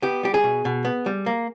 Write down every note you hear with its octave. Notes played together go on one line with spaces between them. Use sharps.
B3 G4
G3 G4
G#4
B2
B2
B3
G3
A#3